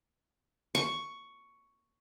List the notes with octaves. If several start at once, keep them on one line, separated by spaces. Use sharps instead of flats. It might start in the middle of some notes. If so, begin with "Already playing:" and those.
C#6